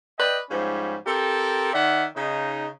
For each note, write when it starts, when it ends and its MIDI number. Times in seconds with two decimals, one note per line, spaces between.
0.19 0.38 71
0.19 0.38 74
0.19 0.38 75
0.19 0.38 79
0.50 0.96 44
0.50 0.96 53
0.50 0.96 55
0.50 0.96 61
1.06 1.72 60
1.06 1.72 67
1.06 1.72 69
1.06 1.72 70
1.73 2.04 51
1.73 2.04 74
1.73 2.04 76
1.73 2.04 78
2.15 2.68 49
2.15 2.68 63